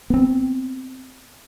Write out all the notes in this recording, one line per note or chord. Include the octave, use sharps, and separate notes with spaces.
B3 C4